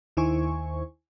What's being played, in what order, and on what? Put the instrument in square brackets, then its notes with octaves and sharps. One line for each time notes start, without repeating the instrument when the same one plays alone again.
[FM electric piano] D#2 D#3 E4 C5 G#5 C#6